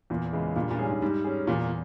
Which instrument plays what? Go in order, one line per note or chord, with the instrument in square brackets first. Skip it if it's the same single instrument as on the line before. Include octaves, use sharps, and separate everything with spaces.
[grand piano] E2 [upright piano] A#2
[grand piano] C#3 E3 G#3
[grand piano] G2 [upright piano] A#2
[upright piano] A#2
[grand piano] E3 G3 C#4 G#4
[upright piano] G#2
[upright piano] G#2 [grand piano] G3
[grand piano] C#4 G#4
[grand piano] E2 [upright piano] A#2